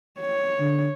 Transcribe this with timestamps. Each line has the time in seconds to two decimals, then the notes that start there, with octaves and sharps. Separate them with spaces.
0.20 C#5
0.60 D3